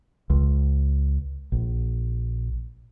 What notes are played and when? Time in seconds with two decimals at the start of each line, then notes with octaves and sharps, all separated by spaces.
0.30 C#2
1.52 A#1